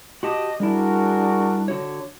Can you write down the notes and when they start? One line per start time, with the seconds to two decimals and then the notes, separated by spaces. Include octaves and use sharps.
0.23 F#4 G4 D#5 A5
0.60 G3 D4 E4 F#4 G#4 A#4
1.68 D3 F#4 C#5